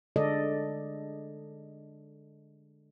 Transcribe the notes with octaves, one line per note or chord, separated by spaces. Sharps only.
D3 G#3 A4 D5 D#5